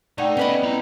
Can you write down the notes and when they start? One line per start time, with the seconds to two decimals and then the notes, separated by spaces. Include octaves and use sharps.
0.18 A3 D#4 D5 F#5 G5
0.37 B3 C#4 B4 D#5 B5
0.63 E4 A#5